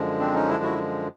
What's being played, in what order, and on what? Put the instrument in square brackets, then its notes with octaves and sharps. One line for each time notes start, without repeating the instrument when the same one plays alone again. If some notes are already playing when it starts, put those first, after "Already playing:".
Already playing: [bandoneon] F#2 D3 F3 G#3
C4 D4
C#4 D#4
D4 E4
E4 F#4